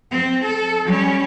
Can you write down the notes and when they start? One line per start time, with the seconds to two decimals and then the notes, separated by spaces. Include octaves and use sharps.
0.12 C4
0.44 A4
0.86 G3 C#4